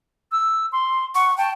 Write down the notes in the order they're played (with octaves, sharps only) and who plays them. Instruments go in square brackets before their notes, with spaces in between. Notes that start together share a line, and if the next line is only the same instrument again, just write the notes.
[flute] E6
C6
[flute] F#5 [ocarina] C#6
[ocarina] G5 [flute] A5